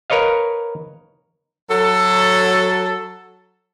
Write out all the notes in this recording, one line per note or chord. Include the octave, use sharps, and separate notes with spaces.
A#4 B4 C#5 D#5 F5
F#3 A4